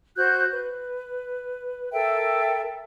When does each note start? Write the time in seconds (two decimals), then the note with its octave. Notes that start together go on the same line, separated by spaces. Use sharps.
0.17 F#4 C5 F#6 G6
0.52 B4
1.93 A4 A#4 E5 G5